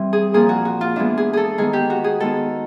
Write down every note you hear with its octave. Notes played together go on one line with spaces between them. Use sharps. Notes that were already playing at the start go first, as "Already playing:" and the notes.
Already playing: E3 G3 C4
G#4
A#2 F3 A#3 G#4
F#4
F#4
F4
E3 G#3 B3 D4
G#4
G#4 A4
D#3 G#3 B3 G#4
G4
F#4
G#4
D#3 G#3 B3 A4